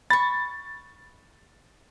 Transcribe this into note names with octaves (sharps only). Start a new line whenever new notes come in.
B5 C#6 A6